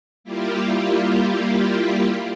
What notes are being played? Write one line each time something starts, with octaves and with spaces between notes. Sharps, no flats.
G3 A#3 E4 F4 G4